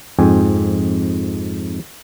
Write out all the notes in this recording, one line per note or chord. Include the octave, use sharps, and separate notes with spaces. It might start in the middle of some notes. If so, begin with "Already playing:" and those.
F2 G#2 G5 G#5